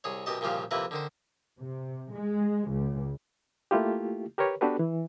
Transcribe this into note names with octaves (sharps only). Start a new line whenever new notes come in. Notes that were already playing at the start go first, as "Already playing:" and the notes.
C2 G#4 C#5
F#2 B2 G4 D#5 A5
C2 A#2 C#3 F3 G4 F5
F2 C3 A#3 E4 B4
D3 D#3 C5
C3
G#3
C#2
A3 A#3 E4 F4 G4
G4 A#4 B4 C#5
B3 D4 F#4 G4 A4 B4
E3